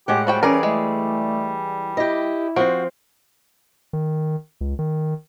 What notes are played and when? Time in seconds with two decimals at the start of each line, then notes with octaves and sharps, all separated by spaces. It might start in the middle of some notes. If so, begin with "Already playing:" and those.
0.08 A2 G#3 G4 F#5
0.27 F3 G3 F#4 G5
0.43 E3 C#4 G#4 A#4 D5
0.63 G#3 A3
1.97 E4 G4 D#5
2.56 F3 C4 F#4
3.93 D#3
4.61 C#2
4.79 D#3